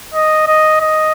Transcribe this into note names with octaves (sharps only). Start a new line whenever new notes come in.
D#5
D#5
D#5